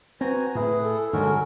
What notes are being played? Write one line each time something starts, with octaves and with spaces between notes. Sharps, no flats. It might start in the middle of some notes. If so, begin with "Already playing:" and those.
C4 F#4 B4 G#5 A#5
A2 E4 G#4 B4
A4
G2 D3 G#3 C#4 F#4 A#4